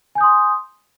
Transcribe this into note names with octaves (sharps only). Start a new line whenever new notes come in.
G#5 C6 D#6 G6